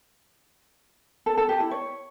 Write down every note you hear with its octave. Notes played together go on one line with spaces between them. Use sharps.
A4
A4
G4
E4
C#5